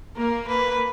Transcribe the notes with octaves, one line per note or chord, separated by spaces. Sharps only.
A#3 A#4
B4